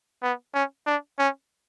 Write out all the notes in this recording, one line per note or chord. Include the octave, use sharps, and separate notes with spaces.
B3
C#4
D4
C#4